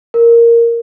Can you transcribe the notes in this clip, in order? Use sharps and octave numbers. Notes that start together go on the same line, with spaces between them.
A#4